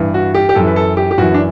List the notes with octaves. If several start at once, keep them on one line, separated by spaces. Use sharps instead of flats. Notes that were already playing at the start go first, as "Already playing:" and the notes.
Already playing: G2 E3
F#4
G4
G4
F#2 E3 A4
B4
A4
G4
G4
F#2 E3 F#4
D4